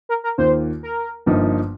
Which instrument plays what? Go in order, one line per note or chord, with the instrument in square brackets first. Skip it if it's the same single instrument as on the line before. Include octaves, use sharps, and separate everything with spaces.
[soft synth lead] A#4
A#4
[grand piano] D#2 D#3 A#3 F4 [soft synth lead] C5
[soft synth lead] A#4
[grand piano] G1 G2 F3 A#3 D#4